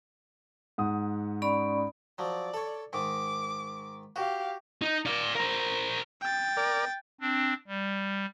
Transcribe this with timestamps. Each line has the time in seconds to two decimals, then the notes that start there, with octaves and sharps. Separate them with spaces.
0.78 G#2 F#5 D#6
1.42 C#4 D5 B5
2.18 F3 F#3 D5
2.54 A4 C#5
2.93 G#2 D#3 D6
4.16 F#4 G4 F5
4.82 D#4
5.06 D5 F5
5.35 A#4 C5
6.21 G5 A6
6.57 A#4 D5
7.21 C4 D4
7.67 G3